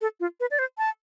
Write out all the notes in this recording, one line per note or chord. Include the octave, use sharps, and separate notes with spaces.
A4
F4
B4
D5
C5
A5